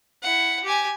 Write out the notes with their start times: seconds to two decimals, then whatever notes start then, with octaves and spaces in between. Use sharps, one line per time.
0.23 E4 F#5
0.64 G4 G#5